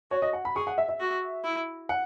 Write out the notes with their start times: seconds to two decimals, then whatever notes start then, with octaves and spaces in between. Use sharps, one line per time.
0.11 F#4 C#5
0.22 D#5
0.33 F#5
0.45 B5
0.55 G#4 C#6
0.67 F#5
0.78 E5
0.89 E5
1.00 F#4
1.44 E4
1.89 F#5